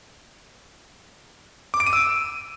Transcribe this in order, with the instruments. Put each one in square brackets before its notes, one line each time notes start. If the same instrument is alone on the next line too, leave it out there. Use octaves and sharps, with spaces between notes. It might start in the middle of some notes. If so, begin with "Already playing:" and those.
[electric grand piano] D6
D7
D#7
E6